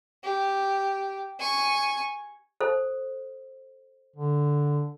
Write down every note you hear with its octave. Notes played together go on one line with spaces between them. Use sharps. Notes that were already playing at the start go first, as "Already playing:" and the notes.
G4
G#5 C#6
A4 C5
D3